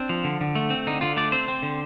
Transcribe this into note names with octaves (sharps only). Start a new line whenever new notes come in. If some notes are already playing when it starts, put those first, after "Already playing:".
Already playing: C4 D4
F3
D3
D3
A3
C4
D3 D#4
D3 F4
A3 D5
C4 C5
C4
D3